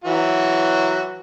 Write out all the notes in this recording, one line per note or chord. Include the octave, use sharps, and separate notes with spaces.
E3 F#3 F#4